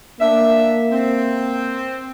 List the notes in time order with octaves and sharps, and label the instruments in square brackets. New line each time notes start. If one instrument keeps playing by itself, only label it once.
[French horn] A#3 [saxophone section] D4 E5
[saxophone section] C4